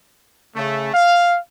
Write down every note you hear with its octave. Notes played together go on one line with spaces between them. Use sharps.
C#3 A3
F5